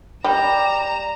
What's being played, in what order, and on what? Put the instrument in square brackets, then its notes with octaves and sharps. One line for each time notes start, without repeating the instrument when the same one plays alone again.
[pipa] G3 [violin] A#5 E7